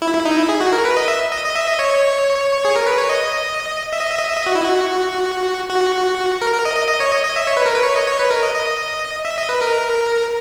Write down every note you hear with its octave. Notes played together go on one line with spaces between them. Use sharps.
E4
E4
D#4
E4
G#4
F#4
A#4
B4
D#5
E5
D#5
D#5
E5
D#5
C#5
G#4
A#4
B4
C#5
D#5
E5
D#5
E5
D#5
E5
D#5
F#4
E4
F#4
F#4
A#4
A#4
D#5
D#5
D#5
C#5
D#5
D#5
E5
C#5
B4
A#4
B4
C#5
D#5
C#5
B4
A#4
D#5
D#5
E5
D#5
B4
A#4